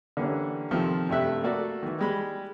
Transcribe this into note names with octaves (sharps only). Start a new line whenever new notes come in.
D3 E3 G3 A#3 C#4
C3 D#3 F3 C4 A4
G2 C3 A3 E5 F#6
A3 A#3 F#4 A4 D5
D#3 E3
G3 G#3 B5